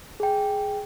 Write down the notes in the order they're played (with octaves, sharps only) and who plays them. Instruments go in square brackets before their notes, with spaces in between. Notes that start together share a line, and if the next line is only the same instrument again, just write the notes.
[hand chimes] G#4 G5